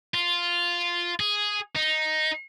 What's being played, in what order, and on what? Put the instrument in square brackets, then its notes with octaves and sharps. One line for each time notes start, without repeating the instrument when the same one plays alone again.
[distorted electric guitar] F4
G#4
D#4